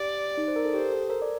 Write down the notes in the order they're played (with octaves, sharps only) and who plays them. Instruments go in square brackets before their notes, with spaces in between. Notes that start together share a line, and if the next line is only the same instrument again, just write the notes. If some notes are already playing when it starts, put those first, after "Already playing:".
Already playing: [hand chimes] G4 [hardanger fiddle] D5
[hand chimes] D#4
C5
A#4
A4
[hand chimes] G4 [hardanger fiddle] C5
[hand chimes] A4
A#4
D5